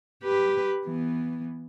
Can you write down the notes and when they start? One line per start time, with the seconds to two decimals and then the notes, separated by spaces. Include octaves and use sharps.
0.23 G4 B4
0.85 E3 B3